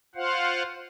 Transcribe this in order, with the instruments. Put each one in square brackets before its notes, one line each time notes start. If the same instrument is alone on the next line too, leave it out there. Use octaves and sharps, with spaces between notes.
[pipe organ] F4 C5 F5 F#5